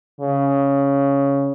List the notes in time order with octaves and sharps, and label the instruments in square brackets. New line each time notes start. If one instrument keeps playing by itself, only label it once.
[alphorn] C#3